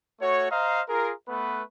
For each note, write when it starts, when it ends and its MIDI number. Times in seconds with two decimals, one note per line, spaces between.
0.21 0.48 57
0.21 0.48 66
0.21 0.48 73
0.50 0.81 72
0.50 0.81 75
0.50 0.81 77
0.50 0.81 82
0.88 1.12 65
0.88 1.12 68
0.88 1.12 70
1.28 1.62 57
1.28 1.62 59
1.28 1.62 71